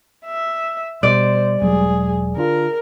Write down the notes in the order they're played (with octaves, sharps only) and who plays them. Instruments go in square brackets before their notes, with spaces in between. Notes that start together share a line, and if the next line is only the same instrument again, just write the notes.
[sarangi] E5
[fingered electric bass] B2 [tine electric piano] G3 [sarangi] C5 [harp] D5
[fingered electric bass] E1 F#3 G#3 [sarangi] G#4
[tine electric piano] D3 D4 F4 [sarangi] A#4